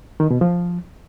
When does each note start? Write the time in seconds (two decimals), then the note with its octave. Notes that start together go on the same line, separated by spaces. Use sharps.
0.20 D#3
0.31 B2
0.41 F3